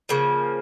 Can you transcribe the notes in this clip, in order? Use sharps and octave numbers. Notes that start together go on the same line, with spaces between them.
C#3 F3 A#3